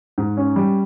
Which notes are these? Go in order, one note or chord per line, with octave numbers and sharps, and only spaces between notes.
G#2
C#4
G3